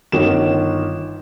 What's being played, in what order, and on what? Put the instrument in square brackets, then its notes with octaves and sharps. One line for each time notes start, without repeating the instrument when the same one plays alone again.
[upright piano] G1 D#3 E7